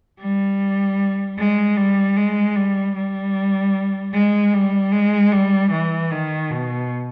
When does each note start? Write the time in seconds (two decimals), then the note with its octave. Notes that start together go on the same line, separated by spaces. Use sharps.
0.20 G3
1.38 G#3
1.77 G3
2.17 G#3
2.56 G3
2.96 G3
4.14 G#3
4.53 G3
4.92 G#3
5.32 G3
5.71 E3
6.11 D#3
6.50 B2